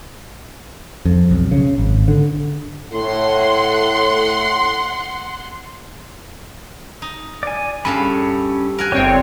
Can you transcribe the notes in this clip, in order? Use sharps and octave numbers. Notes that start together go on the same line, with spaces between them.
F2
B1
C#3
G#1
D3
A2 F#5 C6
D#4
D5 G#5
G2 C#4 A4 F5 B5
A#4 F#5 G#5
G1 C4 G4 C#5 G5